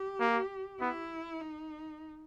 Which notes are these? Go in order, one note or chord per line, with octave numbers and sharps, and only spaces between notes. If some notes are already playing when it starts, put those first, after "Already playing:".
Already playing: G4
A#3
B3 E4
D#4